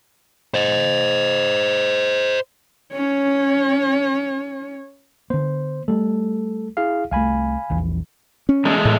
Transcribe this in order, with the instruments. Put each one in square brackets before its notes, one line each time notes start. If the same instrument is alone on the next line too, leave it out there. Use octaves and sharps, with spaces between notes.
[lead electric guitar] C5 D#5
[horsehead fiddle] C#4 C#5
[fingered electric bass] D3 B3 [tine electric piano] C5
[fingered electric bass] G3 A3 [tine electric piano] A4
[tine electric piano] E4 G#4 F5
[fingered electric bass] C2 A3 [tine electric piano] F5 G#5 B5
[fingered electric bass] A#1 E2 E3
[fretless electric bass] C#4
[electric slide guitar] E2 G#3 A3
[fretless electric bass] A2